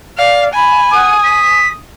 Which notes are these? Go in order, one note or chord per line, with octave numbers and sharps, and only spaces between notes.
D5 F5
G#5 B5
F#5 D#6
B6